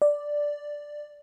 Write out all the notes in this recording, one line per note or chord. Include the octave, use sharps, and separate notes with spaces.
D5